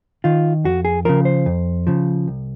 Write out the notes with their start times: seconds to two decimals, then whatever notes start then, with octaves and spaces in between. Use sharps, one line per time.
0.24 D#3 F4
0.64 F2 F#4
0.85 G#4
1.05 C#3 F3 A#4
1.25 C5
1.46 F2
1.87 C#3 F3
2.28 C2